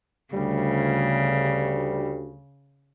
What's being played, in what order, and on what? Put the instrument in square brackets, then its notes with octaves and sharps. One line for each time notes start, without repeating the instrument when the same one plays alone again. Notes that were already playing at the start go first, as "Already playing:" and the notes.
[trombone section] D2 G3 [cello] C#3